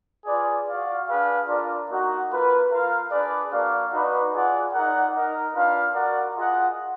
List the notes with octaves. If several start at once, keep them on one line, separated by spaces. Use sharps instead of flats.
F4 G#4 B4 D5
F#4 D5 F5
D4 G#4 B4 F5
D4 F4 A#4 D5
A#3 D#4 F#4
A#3 F4 B4
F4 A#4 F5
D4 G#4 B4 D5
A#3 D4 F#4 D5 F5
D#4 F#4 B4 D5
F4 G#4 D5 F#5
D#4 A#4 D5 F#5
D#4 A#4 D#5
D4 F4 B4 F5
F#4 A#4 D5 F#5
F4 G#4 D#5 F#5